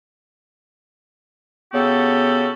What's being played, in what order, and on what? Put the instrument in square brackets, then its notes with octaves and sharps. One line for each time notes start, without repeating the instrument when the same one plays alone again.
[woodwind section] C#3 B3 F#4 G4 A4